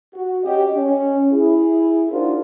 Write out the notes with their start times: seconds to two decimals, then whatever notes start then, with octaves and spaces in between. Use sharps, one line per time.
0.14 F#4
0.44 C#4 G4 D#5
0.75 C#4
1.31 E4 G#4
2.11 D4 D#4 F4 F#4 A#4 C5